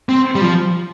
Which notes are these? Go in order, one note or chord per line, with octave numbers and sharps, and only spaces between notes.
C4
G3
F3